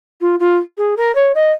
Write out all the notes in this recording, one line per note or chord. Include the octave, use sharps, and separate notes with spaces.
F4
F4
G#4
A#4
C#5
D#5